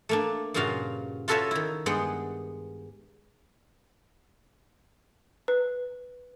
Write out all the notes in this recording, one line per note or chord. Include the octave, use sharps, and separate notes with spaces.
A3 A#3 D4
G2 A#2 C#3 F4 F#4 F5
F4 F#4 A4 B4 C#5 E5
D#3 E4
G2 G#3 B3 F#5 G5
B4